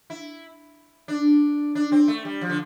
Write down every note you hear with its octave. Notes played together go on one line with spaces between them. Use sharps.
E4
D4
D4
C4
A3
G3
F3
D3